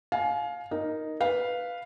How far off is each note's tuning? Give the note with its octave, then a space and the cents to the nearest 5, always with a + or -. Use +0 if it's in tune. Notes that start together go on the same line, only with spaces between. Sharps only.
F5 +15 G#5 +35
D#4 +0 A#4 +0 D#5 +0
B4 +0 F5 +0